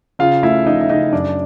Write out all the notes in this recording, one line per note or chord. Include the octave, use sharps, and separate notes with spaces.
C#3 F4 F5
A3 E4 E5
F3 D#4 D#5
E5
C#3 D#4 D#5
F#2 D4 D5